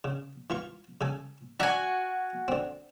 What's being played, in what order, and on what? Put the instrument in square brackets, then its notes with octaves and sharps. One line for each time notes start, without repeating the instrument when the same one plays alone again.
[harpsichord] C#3
E3 F4 C#6
C#3 A4 G#5
[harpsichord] D4 E5 A#5 [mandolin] F#4 G#5
[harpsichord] D3 C4